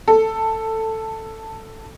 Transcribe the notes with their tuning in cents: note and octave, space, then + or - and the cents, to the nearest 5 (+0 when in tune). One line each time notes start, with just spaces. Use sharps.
A4 +10